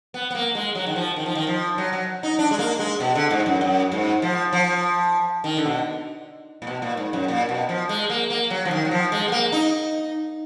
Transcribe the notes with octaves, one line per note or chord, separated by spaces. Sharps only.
B3
B3
A#3
G#3
F#3
D#3
F3
D#3
F3
D#3
F3
F#3
F#3
D#4
D4
G#3
A#3
G#3
B2
D3
G#2
F#2
F#2
G#2
F3
F3
D#3
D3
B2
A#2
B2
A#2
G#2
F#2
A#2
B2
F3
G#3
A#3
A#3
F#3
F3
D#3
F#3
F3
G#3
B3
A#3
D#4